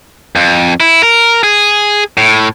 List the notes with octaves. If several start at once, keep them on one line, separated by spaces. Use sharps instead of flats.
F2
E4
A#4
G#4
A2